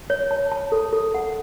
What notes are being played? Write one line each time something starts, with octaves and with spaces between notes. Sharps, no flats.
C#5
A5
A5
A4
A4
F#5